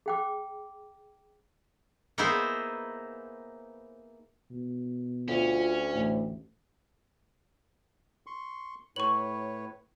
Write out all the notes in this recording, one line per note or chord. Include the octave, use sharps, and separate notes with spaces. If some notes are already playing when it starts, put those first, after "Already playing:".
G#4 G5 D6
A#3 B3 D#4 E4 G#4 C5
B2
D2 C#4 F4
A1 A2
C6 C#6
A2 B4 C#5 C#6 F#7